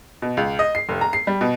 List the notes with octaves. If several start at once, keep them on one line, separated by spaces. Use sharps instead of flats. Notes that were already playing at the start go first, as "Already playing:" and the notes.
B2
C#2
D#5
C7
F1
A#5
C7
G3
B2